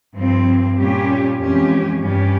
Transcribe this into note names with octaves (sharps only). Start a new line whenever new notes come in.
G2 F3 C4
A#2 G3 C#4 G4
F2 E3 G#3 C#4 G4
G2 G3 C#4 G4